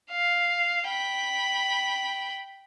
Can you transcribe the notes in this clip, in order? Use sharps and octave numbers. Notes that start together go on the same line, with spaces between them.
F5
G5 B5